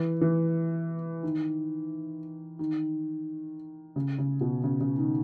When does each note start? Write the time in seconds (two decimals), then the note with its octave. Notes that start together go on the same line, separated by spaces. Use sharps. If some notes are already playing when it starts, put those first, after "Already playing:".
Already playing: E3
0.21 E3
1.23 D#3
2.59 D#3
3.96 C#3
4.18 C#3
4.41 B2
4.64 C#3
4.81 C#3
4.98 D#3